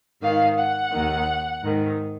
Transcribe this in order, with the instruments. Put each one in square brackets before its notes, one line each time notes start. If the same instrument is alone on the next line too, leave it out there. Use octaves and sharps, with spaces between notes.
[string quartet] G#2 D#3 F5
F#5
D#2 D#3
G#2 D#3